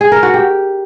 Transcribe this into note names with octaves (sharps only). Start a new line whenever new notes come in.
G#4
A#4
F#4
G4